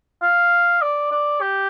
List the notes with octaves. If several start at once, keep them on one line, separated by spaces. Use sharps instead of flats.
F5
D5
D5
G4